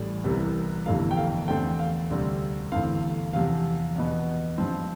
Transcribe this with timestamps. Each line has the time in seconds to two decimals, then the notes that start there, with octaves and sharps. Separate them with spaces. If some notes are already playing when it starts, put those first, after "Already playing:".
Already playing: A1 A2 G3
0.24 C2 C3 E3 G3 B3
0.86 G1 F2 C3 E3 A3 F5
1.11 G5
1.17 F5
1.48 E2 D3 A3 C4 G5
1.79 F5
2.10 D2 C3 G3 C4
2.72 G1 G2 E3 A3 C4 F5
3.33 E2 C3 F3 F5
3.95 E2 B2 B3
4.58 G2 F3 C4